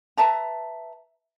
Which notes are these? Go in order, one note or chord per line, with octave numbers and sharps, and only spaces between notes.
B4 E5 A5 A#5